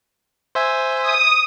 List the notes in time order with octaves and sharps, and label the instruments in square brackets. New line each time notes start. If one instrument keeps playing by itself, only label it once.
[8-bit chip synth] C5 E5 G#5
[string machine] D#6